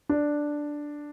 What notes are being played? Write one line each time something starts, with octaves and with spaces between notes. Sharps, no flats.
D4